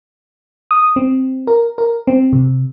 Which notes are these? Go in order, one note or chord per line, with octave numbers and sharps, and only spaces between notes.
D#6
C4
A#4
A#4
C4
C3